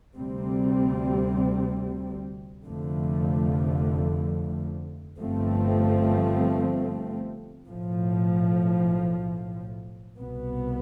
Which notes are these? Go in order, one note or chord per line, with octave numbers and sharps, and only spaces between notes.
D2 C3 G3 C4
F1 F2 D3 F3 A3
G1 G2 F3 A3 C4
B1 A2 F3
C2 B2 B3